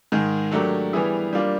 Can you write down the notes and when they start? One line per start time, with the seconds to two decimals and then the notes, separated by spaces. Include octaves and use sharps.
0.12 G#2 D#3 G#3
0.51 F#3 A3 D4 G4 A#4
0.93 E3 G3 B3 E4 G#4
1.33 G3 A#3 D4 F4